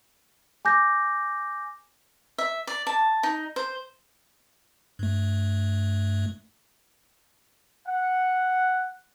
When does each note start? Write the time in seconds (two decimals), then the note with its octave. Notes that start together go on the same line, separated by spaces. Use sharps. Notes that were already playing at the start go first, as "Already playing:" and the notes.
0.65 G#5 D6 G6 A#6
2.38 E5
2.67 D5
2.87 A5
3.23 D#4
3.56 C5
4.99 G2 A3
7.87 F#5